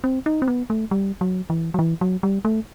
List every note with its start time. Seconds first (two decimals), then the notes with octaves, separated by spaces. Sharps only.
0.04 C4
0.26 D#4
0.42 C4
0.48 B3
0.70 A3
0.91 G3
1.21 F#3
1.50 E3
1.74 F#3
1.79 E3
2.01 F#3
2.23 G3
2.45 A3